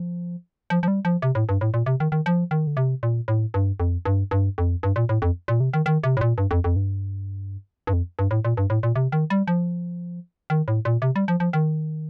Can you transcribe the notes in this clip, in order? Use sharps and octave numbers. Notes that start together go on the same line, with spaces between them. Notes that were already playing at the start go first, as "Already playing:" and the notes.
Already playing: F3
F3
F3
G3
F3
C3
A2
G2
A2
A#2
C3
D#3
D#3
F3
D#3
D3
C3
A#2
A2
G2
F2
G2
G2
F2
G2
A#2
A2
F2
A#2
C3
D#3
D#3
C3
A2
A#2
G2
F2
F2
G2
G2
F2
G2
A2
A#2
G2
A2
A#2
C3
D#3
G3
F3
D#3
A2
A#2
C3
G3
F3
F3
D#3